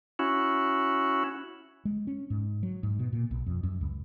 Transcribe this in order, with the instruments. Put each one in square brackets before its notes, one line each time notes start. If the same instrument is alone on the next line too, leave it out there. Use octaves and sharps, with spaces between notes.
[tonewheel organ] C#4 E4 F#4
[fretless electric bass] G#3
C#4
G#2
F#3
G#2
B2
A#2
B1
F2
F#2
C#2